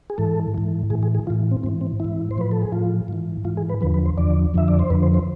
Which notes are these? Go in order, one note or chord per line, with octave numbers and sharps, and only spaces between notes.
G#4
G#2 E3 A4
G#2 E3
A2 E3 G#4
G#4
G#4
A2 E3 F4
C4
G#2 E3 C4
C4
G#2 E3 E4
C5
A2 F3 B4
A4
G#4
A2 F3 F4
G#2 E3
G#2 E3 F4
G#4
B4
E2 D3 F3 B4
B4
C5
E2 D3 F3 D5
F2 D3 F3 E5
D5
C5
F2 D3 F3 B4
C5
C5